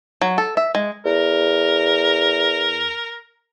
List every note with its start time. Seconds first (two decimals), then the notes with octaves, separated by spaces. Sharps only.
0.21 F#3
0.38 A4
0.57 E5
0.75 G#3
1.05 E2 A#4